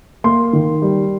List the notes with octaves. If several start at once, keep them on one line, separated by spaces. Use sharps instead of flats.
A#3 C6
D#3
G3